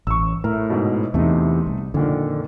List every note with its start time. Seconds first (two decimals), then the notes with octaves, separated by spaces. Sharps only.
0.07 A1 C#6 E6
0.44 A2 A#4 E5
0.70 G#2 B2
1.14 E2 C3 A3 D#4
1.67 C2
1.94 F2 A#2 D3 D#3